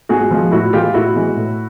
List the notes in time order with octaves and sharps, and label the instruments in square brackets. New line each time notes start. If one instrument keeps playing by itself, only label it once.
[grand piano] G#2 F#4 G#4
F3 G#3
A2 E4 F#4
E3 G#3 F4 G4
A2 E4 F#4
E3 G#3
A2